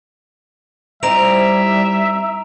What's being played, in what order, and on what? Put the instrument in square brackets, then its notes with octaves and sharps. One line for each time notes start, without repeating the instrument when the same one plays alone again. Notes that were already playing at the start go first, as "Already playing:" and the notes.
[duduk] G3 [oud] C4 D#4 E4 [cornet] E5 [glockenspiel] A#5 D7 F7